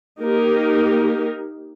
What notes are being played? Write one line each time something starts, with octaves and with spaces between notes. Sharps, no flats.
A#3 D#4 G4 A#4